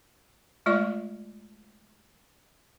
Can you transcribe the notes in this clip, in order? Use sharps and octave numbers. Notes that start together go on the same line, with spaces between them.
G#3 A3 F4 D5 D#5 C#6